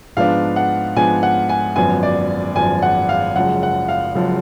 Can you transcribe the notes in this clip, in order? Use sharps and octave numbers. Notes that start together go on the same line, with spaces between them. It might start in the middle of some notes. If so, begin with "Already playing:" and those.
G#2 F3 B3 D4 F5
F#5
G#2 F3 B3 D4 G#5
F#5
G#5
G#1 F#2 F3 B3 G#5
D5
G#1 F#2 F3 B3 G#5
F#5
F5
F#1 F#2 F3 G#3 F#5
F#5
F5
F#1 F#2 F3 G#3